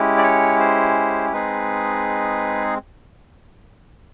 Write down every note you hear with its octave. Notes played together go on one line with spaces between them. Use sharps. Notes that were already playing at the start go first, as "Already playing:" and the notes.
Already playing: G#3 C#4 E4 G4
D5
C#5
C5
G#3 C4 D#4 G#4 B4